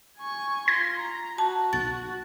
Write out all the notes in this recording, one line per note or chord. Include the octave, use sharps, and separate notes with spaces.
G#5 C#6
F4 C6 G#6 A#6
A#5
F#4 A5
B1 A6